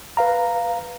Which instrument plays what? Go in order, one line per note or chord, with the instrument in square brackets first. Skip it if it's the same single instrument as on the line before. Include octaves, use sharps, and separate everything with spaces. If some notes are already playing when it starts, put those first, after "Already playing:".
[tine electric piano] B4 F5 A#5